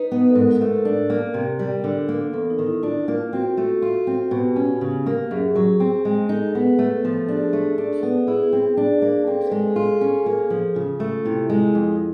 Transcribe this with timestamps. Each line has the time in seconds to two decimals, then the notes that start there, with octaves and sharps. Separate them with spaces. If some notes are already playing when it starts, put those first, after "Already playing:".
Already playing: D#4 B4
0.12 B3
0.30 A4
0.35 G#2 A#4
0.61 A3
0.85 D4
1.10 A#3
1.34 C3
1.59 G3
1.84 D3
2.09 A#3
2.33 E2 A4
2.50 D#4
2.59 D#3
2.66 E4
2.83 D4 F4
3.08 A#3
3.33 C4 F#4
3.57 A3
3.82 F4
4.07 C4
4.31 B2 G4
4.56 C#4
4.81 C#3
5.06 A#3
5.31 F#2 G#4
5.56 F#3
5.80 C4
6.05 G#3
6.29 D#4 A4
6.55 B3
6.79 A3
7.05 F3
7.20 G4
7.28 D4 G#4
7.53 A3
7.78 D4
8.03 B3
8.27 E4 G#4
8.53 C4
8.77 D4
9.02 A#3
9.26 C4 A4
9.44 B4
9.51 G#3
9.59 A4
9.70 G#4
9.76 F4
9.81 A4
10.01 C#4
10.26 A#3
10.50 F3
10.75 C#3 F4
11.00 A3 F4
11.25 C3 E4
11.50 G#3
11.75 F2